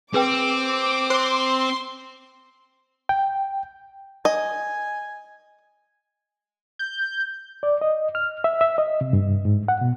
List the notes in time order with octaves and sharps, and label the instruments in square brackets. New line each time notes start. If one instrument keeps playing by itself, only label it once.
[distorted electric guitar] C4 [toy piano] G#4 B4 G5 [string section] D6
[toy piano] C5 [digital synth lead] C6
[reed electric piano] G5
[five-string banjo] D#5 [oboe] G#5
[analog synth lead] G6
[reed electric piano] D5
D#5
F6
E5
E5
D#5
C3
G2
G#2
F#5
B2